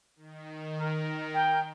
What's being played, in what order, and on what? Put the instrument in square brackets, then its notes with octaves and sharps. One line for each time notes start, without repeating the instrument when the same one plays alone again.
[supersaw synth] D#3
[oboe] A#4
[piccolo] G5